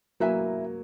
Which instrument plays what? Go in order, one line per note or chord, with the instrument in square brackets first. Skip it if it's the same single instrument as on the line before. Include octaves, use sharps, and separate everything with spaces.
[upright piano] F#3 A#3 [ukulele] E4 B4 E5 G#5